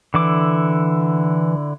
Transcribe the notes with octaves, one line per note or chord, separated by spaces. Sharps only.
D3 E3 E4 D6